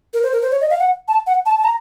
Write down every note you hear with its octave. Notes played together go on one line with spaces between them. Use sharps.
A#4
C5
A#4
C5
C#5
D#5
F5
F#5
A5
F#5
A5
A5
A#5